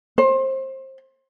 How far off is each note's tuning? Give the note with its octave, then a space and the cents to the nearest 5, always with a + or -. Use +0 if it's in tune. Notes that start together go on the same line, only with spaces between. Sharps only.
C5 +25